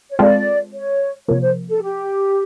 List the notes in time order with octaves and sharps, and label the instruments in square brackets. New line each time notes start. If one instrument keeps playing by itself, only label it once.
[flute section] C#5
[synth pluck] G#3 C4 F4 A4 [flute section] D5
[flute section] C#5
[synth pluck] C3 F3 A#3 [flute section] C#5
[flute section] C5
A4
G4